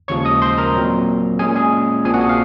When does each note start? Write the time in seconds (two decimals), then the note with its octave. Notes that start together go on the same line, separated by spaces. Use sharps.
0.08 D#2 C#3 F3 G#3 C#5 C#6
0.25 D#5 D#6
0.42 C5 C6
0.58 A#4 A#5
0.75 A#2 F#3 C4
1.39 A#2 G#3 C#4 G#4 G#5
1.55 G#4 G#5
2.05 A#1 A#2 F3 C4 G#4 G#5
2.14 F#4 F#5
2.21 G#4 G#5
2.29 F5